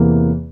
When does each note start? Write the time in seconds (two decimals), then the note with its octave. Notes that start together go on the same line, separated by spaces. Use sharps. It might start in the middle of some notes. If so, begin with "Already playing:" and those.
Already playing: E2 C3 E3 A#3